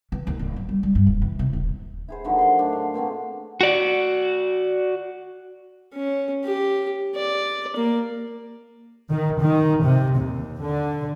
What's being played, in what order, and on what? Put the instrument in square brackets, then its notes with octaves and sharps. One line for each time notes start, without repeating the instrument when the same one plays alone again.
[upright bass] E3
D#2
D1
F#3
G3
G3
G2
D#1
E3
C3
D#1
[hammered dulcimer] E4 G#4 C5
D3 D#3 F3 F#3
F#5 C6
A2 D4
F5
B2 A#3 C4 C#4
[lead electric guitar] F#4 D5
[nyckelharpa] C#4
G4
D5
A#3
[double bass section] D#3
D#3
C3
D#2
D3